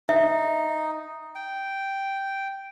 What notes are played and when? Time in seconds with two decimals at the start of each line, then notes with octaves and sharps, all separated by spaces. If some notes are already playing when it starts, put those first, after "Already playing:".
0.09 D#4 E5
1.35 G5